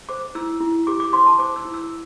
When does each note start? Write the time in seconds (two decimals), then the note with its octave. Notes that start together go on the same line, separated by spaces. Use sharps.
0.09 C5 D6
0.35 E4 E6
0.61 E4
0.87 G4 D6
1.00 D6
1.13 C5 C6
1.26 A5
1.39 C5 D6
1.56 E6
1.65 E4
1.74 E6